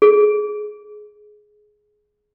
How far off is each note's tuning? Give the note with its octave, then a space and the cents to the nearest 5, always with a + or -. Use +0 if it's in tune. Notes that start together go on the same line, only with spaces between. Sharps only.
G#4 +15